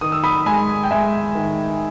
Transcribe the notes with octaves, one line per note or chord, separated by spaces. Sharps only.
D#3 D#6
E6
B5 D#6
G#3 G#5 B5
G5
G#3 E5 G#5
D#3